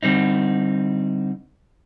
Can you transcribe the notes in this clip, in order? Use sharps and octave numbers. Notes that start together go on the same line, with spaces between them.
D3 G3 C4 D#4